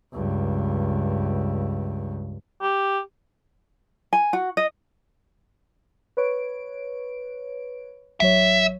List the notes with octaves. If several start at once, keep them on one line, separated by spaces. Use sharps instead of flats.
C#2 G2
G4
G#5
F#4
D#5
B4 C#5 D7
A1 F#3 C#5 E5